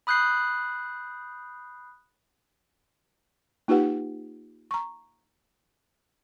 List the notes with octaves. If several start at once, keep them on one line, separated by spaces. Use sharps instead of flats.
B5 D#6 F#6 G6 C7
A#3 D#4 F4 G4 B4 F#5
A#5 C#6